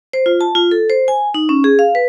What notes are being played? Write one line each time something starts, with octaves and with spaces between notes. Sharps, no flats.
C5
F4
A5
F4
A4
C5
G#5
D#4
C#4
G#4
F5
B4